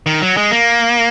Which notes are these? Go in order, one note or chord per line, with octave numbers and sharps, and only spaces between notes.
D#3
F#3
G#3
A#3